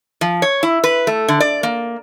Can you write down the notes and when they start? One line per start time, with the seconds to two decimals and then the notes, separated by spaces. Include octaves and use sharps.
0.21 F3
0.42 C#5
0.63 E4
0.84 B4
1.07 A3
1.28 D3
1.40 D5
1.63 A#3